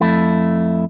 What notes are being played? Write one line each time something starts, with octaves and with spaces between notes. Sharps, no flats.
F2 A3 E4